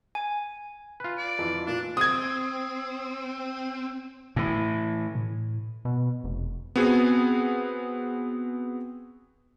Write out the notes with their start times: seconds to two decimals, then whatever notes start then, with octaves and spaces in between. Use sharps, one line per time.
0.15 G#5
1.00 F4 B4
1.18 D5
1.39 F2 E3
1.66 A#2 D4 F4
1.97 C4 D#6 G#6
4.36 A2 E3
5.15 A2
5.85 B2
6.24 F1
6.76 B3 C4 F#4 G#4